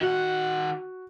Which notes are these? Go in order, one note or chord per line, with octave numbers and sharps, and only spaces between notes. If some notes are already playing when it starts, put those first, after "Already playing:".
D#3 F#4 F#5